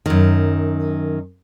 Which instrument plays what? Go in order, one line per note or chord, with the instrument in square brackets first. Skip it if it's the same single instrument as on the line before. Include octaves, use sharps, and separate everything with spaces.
[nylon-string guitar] F#2 D#3